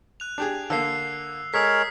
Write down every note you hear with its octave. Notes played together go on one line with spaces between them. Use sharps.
F#6 F7
D4 G4 G#4
D3 A#3 E6 C7
G#3 A4 A#4 C#5 D#6 B6